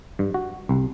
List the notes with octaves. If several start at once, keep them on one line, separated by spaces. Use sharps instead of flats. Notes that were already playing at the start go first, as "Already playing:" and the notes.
G2
F#4
C2